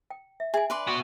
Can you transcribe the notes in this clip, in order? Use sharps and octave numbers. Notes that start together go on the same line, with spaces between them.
G5
E5
G#4 E5 G#5
D4 B4 D5 C6
B3 F#4